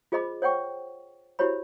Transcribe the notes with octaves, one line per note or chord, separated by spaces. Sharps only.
F4 G#4 C5 D#5 B5 D6
C5 C#5 F#5 G5 C#6
E4 F#4 G4 C5 C#5 B5